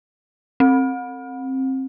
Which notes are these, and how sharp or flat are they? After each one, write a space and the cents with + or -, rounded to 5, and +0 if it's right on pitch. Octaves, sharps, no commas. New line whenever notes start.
C4 +20